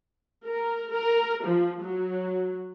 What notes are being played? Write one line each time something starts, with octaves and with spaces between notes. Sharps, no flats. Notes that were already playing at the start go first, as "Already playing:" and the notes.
A#4
A#4
F3
F#3